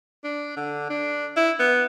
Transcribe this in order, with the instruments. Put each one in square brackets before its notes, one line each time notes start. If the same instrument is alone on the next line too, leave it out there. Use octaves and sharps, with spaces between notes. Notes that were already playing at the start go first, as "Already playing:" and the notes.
[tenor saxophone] D4
D3
D4
E4
B3